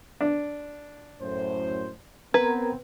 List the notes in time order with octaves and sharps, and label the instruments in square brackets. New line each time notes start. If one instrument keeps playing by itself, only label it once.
[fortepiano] D4
[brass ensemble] F#2 A2 C5
[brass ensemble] B3 C4 [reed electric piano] A#4 A#5 G#6 [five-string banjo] B4